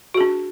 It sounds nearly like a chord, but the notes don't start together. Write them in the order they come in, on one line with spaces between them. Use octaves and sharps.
F#4 G#4 D4